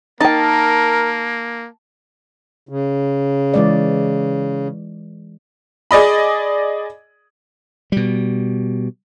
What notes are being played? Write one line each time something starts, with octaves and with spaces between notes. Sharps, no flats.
A#3 D#4 A#4 G5 A5
C#3
E3 G#3 D5
G#4 D5 D#5 B5
B2 G3